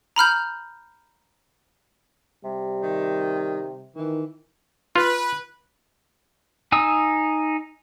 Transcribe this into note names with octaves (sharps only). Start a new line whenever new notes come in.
A#5 B5 F6 G6
C3 G3
D#3
D#3 E3
F4 B4
D#4 G#5 D#6 E6